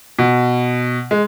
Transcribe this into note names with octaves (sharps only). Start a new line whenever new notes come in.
B2
G#3